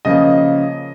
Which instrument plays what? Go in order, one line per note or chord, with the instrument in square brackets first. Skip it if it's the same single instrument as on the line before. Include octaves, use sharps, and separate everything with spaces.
[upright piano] C#3 F3 A#3 D#5